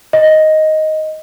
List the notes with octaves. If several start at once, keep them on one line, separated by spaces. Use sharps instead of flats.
D#5